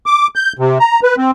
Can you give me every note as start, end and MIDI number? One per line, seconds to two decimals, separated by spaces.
0.06 0.28 86
0.36 0.53 91
0.59 0.78 48
0.80 1.00 82
1.03 1.16 71
1.18 1.31 60